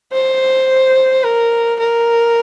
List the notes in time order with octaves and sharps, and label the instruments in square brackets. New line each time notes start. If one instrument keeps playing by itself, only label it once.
[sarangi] C5
A#4
A#4